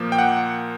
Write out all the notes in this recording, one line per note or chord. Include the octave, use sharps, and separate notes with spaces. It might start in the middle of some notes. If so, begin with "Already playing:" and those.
Already playing: A#2 F3 A#3
G5
F#5